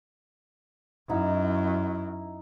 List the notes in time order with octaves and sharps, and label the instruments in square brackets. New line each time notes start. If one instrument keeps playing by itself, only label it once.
[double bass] F#2 [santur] D#4 E4 F#5